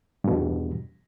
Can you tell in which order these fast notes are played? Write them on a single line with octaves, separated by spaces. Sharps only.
G2 B2 E2